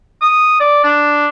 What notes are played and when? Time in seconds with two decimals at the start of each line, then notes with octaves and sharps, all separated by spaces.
0.21 D#6
0.60 D5
0.84 D4